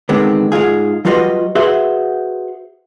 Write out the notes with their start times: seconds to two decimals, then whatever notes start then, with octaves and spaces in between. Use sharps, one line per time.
0.09 D3 D#3 G#3 B3 C4
0.52 G#2 G#3 F4 G#4
1.05 F#3 G3 F4 F#4 B4 D#5
1.55 F#4 G#4 B4 C5 E5 F#5